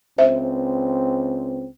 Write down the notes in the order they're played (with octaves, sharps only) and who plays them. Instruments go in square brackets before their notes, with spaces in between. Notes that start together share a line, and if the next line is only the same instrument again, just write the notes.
[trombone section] C#2 C4 [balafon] C5 E5